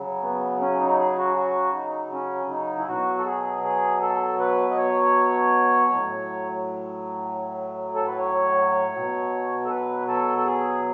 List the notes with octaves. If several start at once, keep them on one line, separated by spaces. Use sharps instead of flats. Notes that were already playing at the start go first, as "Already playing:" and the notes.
Already playing: C#3 F#3
B3
C#4
D#4
G#4
F#4
F#4
D#4
C#4
D#4
E4
B2 F#3 F#4
A4
G#4
G#4
A4
B4
D#5
C#5
A2 F#3
A4
B4
C#5
B2 F#3
A4
B4
A4
A4
G#4